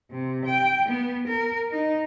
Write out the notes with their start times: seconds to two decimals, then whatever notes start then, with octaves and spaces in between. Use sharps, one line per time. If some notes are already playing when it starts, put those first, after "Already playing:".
0.11 C3
0.45 G5
0.89 B3
1.28 A#4
1.71 D#4